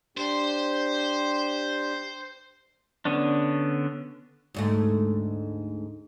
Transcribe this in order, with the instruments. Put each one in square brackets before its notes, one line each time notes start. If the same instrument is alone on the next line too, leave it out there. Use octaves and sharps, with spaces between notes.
[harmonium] D4 G4 [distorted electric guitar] C5
[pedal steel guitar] D3 B3 C#4 D4
[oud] D2 G#2 A3